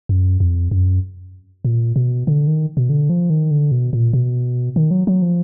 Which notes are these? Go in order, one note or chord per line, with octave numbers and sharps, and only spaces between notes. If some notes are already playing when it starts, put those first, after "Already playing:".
F#2
F2
F#2
A#2
B2
D3
D#3
B2
D3
F3
D#3
D3
B2
A#2
B2
D#3
F#3
F#3
F3